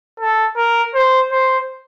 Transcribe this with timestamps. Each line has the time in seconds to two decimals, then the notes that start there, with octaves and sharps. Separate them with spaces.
0.20 A4
0.57 A#4
0.94 C5
1.32 C5